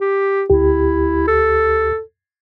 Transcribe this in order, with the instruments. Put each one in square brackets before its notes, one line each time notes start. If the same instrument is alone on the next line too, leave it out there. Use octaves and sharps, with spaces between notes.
[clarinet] G4
[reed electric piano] D2 G4 [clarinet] E4
[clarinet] A4